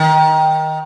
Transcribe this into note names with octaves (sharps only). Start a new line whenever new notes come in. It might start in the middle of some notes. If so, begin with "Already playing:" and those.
Already playing: D#3